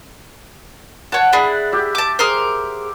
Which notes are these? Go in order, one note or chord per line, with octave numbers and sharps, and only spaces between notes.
C#5 F#5 A5
D4 E4 G#4
G4 E5
A5 D6
G#4 A#4 C5